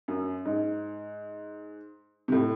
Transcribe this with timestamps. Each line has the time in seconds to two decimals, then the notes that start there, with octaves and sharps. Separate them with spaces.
0.08 F#2
0.45 G#2
2.28 C3
2.32 A2